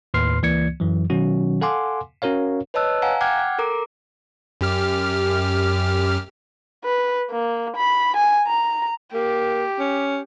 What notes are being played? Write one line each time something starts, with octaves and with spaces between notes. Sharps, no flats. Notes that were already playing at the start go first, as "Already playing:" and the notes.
D#2 A2 B4 C6 F6 C7
C#2 E3 A#3 D5 G#6 C#7
F#2 E3 F#3
B2 D#3 F#3 C#4 F#4
A4 F5 F#5 G#5 C6 D6
C#4 F#4 A#4 C#5 F5
B4 C#5 D#5 A5 E6 F#6
F5 F#5 G#5 A#5
F#5 G5 D6 F6 F#6 G#6
A4 A#4 A#5 D6
F#2 G4 F6
B4
A#3
B5
G#5
A#5
A#3 G4
C#4